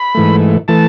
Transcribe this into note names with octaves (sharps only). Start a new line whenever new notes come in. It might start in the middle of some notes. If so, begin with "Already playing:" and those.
Already playing: B5
G#2 E3 A3
E3 A3 A5